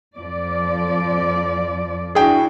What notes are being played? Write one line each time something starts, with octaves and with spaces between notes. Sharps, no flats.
F2 F3 D5
D4 E4 F#4 G#4 G5